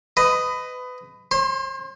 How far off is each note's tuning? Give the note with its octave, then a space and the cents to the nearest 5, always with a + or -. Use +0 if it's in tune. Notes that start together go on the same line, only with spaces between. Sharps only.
B4 +25 D#5 +0
C5 +45 C6 +0